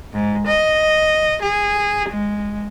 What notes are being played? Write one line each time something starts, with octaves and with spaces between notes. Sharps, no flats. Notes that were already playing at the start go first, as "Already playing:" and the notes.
G#2
D#5
G#4
G#3